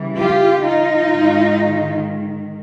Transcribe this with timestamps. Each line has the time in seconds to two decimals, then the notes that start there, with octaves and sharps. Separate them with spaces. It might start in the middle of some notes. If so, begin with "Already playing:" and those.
Already playing: C#3 E3 G3
0.17 F4 G4
0.63 D#4 F4
1.10 G#2 D#3 G#3